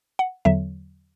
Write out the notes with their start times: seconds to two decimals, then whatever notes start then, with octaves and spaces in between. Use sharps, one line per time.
0.19 F#5
0.45 E2 D3 F#3 E5